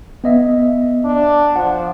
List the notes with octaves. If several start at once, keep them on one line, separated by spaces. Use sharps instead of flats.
B3 D#5 E5
D4
F3 F#5